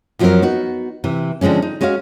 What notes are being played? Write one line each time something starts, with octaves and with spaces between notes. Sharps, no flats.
F#2 F3 F#3 A3 C4 A#4
B3 D#4 F#4
C3 E3
D3 F3 G#3 C4 C#4
D#4
G#3 C#4 F#4 D#5 F5